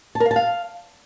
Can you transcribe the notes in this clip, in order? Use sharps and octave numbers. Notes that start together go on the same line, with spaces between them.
A5
A#4
F5
A5
F5